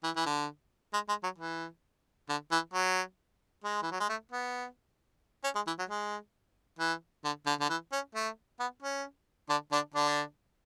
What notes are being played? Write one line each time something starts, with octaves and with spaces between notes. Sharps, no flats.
E3
E3
D3
G#3
G#3
F#3
E3
D3
E3
F#3
G#3
E3
F#3
G#3
A3
B3
C#4
G#3
E3
F#3
G#3
E3
D3
D3
D3
E3
C#4
A3
B3
C#4
D3 D4
D3 D4
D3 D4